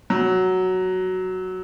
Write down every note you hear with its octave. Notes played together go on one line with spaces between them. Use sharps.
F#3